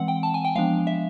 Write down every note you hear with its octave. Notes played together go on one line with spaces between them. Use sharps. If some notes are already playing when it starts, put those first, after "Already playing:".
Already playing: E3 G#3 C4 F#5
G5
A5
G#5
G5
F3 G#3 B3 D4 F5
E5